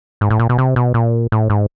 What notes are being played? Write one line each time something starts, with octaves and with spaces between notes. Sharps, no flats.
G#2
A2
A#2
B2
C3
B2
A#2
A2
G#2